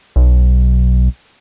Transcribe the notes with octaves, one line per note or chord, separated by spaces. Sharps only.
B1